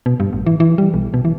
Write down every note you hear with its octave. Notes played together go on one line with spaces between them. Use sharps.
B2
G2
A1
E3
E3
G3
B1
B2
E3